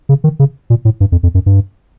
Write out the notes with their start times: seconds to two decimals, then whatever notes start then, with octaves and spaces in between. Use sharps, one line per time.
0.09 C#3
0.24 D#3
0.39 C#3
0.70 A#2
0.85 A2
1.00 G2
1.12 F2
1.23 F2
1.34 F#2
1.46 G2